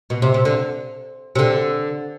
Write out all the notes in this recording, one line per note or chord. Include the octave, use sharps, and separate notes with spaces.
B2
C3
C3
D3
C3
D3